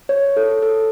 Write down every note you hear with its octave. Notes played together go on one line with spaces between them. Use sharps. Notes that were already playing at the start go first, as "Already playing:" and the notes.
C#5
A4
A4